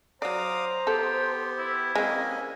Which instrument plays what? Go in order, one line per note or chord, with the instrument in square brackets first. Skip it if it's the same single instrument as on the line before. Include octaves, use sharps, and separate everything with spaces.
[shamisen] F#3 D5 [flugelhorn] C5 [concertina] F5 D6 D#6 [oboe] A#5
[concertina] B3 G4 [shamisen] A4 [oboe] G5
[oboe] E4
[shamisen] G#3 C4 [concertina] A#3 C#4 D#5